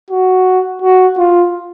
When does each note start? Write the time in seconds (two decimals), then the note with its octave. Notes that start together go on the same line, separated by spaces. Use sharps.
0.10 F#4
0.82 F#4
1.18 F4